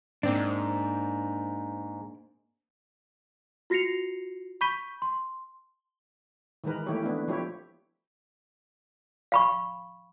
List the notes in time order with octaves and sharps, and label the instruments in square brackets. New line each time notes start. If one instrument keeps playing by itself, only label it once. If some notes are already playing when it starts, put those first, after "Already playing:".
[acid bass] G#2 [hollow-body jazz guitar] A#3 C4 D4
[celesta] F4 F#4 A#6 C7 C#7 F7
B5 C#6 G6 B6 D#7 G7
C6
[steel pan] D#3 E3 G#3 A#4 B4
E3 A3 A#3 E4 G4 C#5
A3 B3 D4 E4
F3 E4 G4 C#5
[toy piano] F5 B5 C#6